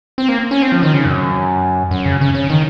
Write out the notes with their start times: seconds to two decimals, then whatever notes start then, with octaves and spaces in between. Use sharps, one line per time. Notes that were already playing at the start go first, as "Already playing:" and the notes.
0.18 C4
0.29 A#3
0.51 C#4
0.62 C4
0.72 F3
0.83 D#3
0.94 C#3
1.05 F#2
1.91 F#2
2.05 C#3
2.21 C#3
2.34 C#3
2.50 D#3